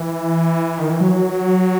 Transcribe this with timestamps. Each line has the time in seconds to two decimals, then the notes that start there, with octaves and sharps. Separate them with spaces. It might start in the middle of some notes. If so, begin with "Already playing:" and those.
Already playing: E3
0.78 D#3
0.90 E3
1.01 F#3